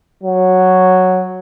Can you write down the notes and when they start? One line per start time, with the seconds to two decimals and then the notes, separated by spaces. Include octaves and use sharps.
0.23 F#3